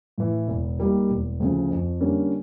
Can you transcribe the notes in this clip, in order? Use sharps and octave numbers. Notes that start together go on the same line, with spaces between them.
A2 E3
E1
D#2 D#3 G3 A#3
E1
D2 C#3 F3
F2
D3 G3 A#3 C#4